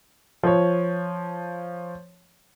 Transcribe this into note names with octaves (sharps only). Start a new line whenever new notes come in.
F3 C#5